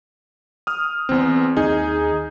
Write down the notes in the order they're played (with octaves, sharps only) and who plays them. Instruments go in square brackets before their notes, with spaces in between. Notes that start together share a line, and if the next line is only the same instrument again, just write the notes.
[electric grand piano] D#6 F6
[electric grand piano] E2 C4 [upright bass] E4
[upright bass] D#2 [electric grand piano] D#4 G#4